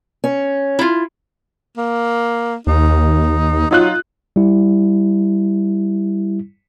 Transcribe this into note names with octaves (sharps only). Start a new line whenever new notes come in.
C#4
E4 F4
A#3
D#2 D#4
F#3 D#4 F4 F#6
G3 E4